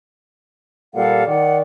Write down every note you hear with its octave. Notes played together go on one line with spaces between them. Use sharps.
A#2 G3 A4 F5 F#5
D#3 D5 F#5